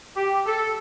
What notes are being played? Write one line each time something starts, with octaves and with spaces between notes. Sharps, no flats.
G4
A4